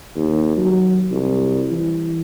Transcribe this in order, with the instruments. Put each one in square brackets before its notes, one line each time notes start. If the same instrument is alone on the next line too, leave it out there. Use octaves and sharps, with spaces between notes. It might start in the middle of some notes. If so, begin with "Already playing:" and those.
[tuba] D#2
F#3
C2
E3